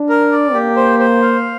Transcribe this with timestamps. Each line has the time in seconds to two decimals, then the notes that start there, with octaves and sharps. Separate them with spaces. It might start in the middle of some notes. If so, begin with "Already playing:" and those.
Already playing: D4
0.09 A#4
0.32 D5
0.54 A#3 G4
0.76 C5
0.99 C5
1.22 F5